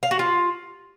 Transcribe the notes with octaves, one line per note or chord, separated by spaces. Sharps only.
F5
F#4
F4